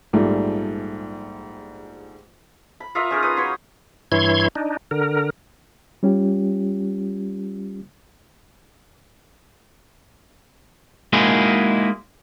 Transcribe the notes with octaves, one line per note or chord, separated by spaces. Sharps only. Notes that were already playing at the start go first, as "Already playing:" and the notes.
A#1 G#2 F3 G3 A3
B5
F4 A#4 D#5 E5
C#4 D#4 G#4 A#4
D#4 B4 D#6
F#3 C#5 B5 C6
G2 E3 E4 C#5 C6 G#6
D4 D#4
D3 A#4
G3 C#4 F4 G4
G#3 A#3 D#4 E4 F#4 G#4